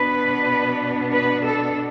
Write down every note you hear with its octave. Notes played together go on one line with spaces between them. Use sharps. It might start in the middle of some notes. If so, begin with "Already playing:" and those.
Already playing: B2 B3 D4 B4
B4
A4